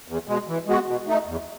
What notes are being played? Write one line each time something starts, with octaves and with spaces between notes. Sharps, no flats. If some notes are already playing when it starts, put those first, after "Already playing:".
E2
B2 G#3
E3
G#3 B3 F#4
B2
A3 D#4
E2